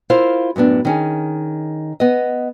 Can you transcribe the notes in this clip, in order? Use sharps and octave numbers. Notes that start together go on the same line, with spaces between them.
E4 F4 A#4 C5 F5
F#2 A2 B3 D4
D#3 C#4 G#4
B3 D#5